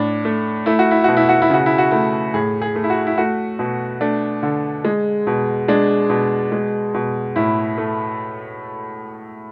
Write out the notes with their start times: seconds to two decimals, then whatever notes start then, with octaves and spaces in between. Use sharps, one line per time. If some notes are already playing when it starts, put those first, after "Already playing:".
Already playing: A2 D4
0.25 A3
0.66 A3 E4
0.79 F#4
0.91 E4
1.04 B2 F#4
1.17 E4
1.29 F#4
1.42 E4
1.50 C#3 F#4
1.66 E4
1.78 F#4
1.91 A3 E4
2.34 A2 G#4
2.62 G#4
2.76 A3
2.84 E4
2.90 F#4
3.07 E4
3.18 A3 F#4
3.59 B2
4.01 A3 D4
4.43 D3
4.85 G#3
5.27 B2
5.68 G#3 D4
6.10 B2
6.52 G#3
6.94 B2
7.36 A2 E4
7.78 A3